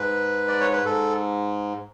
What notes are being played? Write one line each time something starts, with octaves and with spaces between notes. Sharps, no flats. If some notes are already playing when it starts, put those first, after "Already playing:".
Already playing: G#2 B4
D5
C#5
B4
G#2 A4